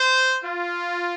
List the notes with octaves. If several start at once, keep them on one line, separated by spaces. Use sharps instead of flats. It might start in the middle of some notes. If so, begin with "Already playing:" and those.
Already playing: C5
F4